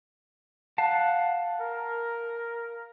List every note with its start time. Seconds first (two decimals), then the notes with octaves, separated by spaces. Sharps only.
0.78 F5 F#5 A5
1.61 A#4